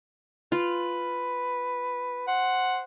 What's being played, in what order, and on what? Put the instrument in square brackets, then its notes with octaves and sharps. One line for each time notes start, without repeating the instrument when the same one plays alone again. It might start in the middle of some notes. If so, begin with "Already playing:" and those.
[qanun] F4 [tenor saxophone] B4
[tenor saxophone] C5 [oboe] F#5